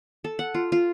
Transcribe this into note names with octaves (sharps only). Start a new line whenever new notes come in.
A4
F#5
F4
F4